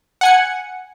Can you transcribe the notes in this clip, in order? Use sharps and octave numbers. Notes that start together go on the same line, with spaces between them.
F#5 G#5 C#7